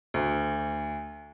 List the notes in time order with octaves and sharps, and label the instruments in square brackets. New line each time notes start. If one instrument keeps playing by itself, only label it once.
[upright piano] D2